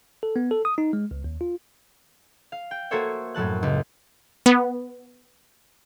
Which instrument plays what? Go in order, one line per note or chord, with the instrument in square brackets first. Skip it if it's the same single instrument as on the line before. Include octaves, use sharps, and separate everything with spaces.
[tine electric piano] A4
B3
A4
D#6
D#4
G#3
C#2
D#2
F4
[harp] F5
G5
A#3 F#4 A4 C5 C#5 E5
F#2 A2 F#3 A5 F#6
C#2
[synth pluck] B3